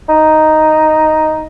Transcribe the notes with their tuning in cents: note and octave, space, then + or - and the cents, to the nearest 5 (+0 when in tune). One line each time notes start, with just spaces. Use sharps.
D#4 +0